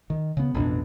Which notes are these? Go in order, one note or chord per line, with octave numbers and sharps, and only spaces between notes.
D#3
C#3 B3
A1 F2 B2 D4